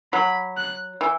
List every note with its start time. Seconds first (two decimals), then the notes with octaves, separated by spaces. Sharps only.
0.13 F#3 B5
0.57 F#6
1.01 E3